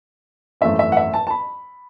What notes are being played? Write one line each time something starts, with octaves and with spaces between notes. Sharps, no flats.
G#1 F#2 E3 A3 E5
E5
F#5
E5
A5
A5
B5